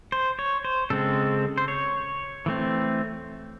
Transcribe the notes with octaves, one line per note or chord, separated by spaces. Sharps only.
C5
C#5
C5
C#3 G#3 C4 A4
C5
C#5
E3 A3 C4